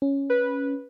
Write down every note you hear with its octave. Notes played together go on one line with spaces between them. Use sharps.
C#4
B4